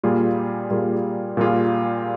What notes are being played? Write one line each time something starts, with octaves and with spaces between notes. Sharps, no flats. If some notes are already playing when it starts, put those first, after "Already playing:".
A#2 G3 A#3 F4 G#4
A#2 G3 A#3 F4 G#4
A#2 G3 A#3 F4 G#4